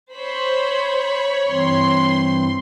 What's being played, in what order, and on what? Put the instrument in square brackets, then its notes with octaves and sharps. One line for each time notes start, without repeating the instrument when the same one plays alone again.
[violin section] C5 [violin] C#5 B5
[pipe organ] G2 E3 C4 [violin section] C6